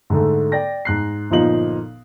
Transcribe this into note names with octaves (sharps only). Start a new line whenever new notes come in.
G#2 D3 A3
D5 G5 A#6
G#2 F#6 C7
G1 A#2 F3 D#4 F#7